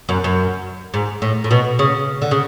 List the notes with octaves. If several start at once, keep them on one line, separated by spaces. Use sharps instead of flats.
F#2
F#2
G#2
A2
A2
B2
C#3
D3
C#3